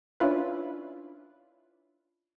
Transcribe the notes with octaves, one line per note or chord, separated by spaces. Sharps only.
C#4 D4 E4 F4 B4